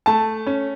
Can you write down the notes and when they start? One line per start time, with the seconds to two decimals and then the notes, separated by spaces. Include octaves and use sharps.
0.06 A3 A5
0.47 C#4